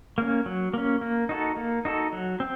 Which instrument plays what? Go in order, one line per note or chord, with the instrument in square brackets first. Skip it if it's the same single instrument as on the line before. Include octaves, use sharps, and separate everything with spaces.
[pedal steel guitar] A#3 C#4
F#3
A#3 C#4
A#3
D#4 F#4 A4
A#3
D#4 F#4 A4
F#3
C4